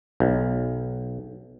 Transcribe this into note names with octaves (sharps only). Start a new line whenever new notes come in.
B1